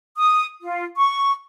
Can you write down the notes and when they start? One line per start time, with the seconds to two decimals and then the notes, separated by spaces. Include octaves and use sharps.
0.18 D#6
0.61 F4
0.97 C#6